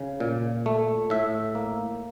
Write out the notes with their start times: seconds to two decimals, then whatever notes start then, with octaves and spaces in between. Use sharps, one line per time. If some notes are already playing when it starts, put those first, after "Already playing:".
Already playing: C#3
0.20 A#2
0.66 A3
1.10 A2 E5
1.55 A#3